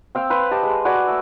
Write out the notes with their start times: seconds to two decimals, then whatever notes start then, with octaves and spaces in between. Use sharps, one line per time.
0.15 C4 F5 G5 E6
0.30 B4 C5 F5
0.51 G4 D#5 G5 A5
0.63 G#3
0.85 F#4 B4 D5 G#5
1.07 A3 E6